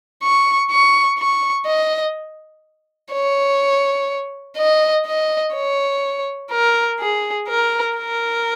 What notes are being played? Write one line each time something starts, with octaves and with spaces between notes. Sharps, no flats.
C#6
C#6
C#6
D#5
C#5
D#5
D#5
C#5
A#4
G#4
A#4
A#4